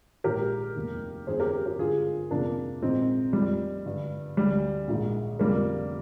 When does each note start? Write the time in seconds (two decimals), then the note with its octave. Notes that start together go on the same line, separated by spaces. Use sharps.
0.24 A#1 G#2 D#3 G4 A#4
0.76 F1 D#2 D#3
1.27 G1 F2 D#3 G#4 C5
1.40 G4 A#4
1.66 G4 A#4
1.78 G#1 G2 D3 F4 G#4
2.31 G1 F2 C3 D#3 A#3 D4
2.82 A#1 G#2 D#3 C4 D#4
3.33 F1 F2 D#3 G3
3.85 G#1 G2 D3
4.37 D2 D3 G3
4.88 A#1 G#2 D#3
5.39 F1 F2 D3 G3 A#3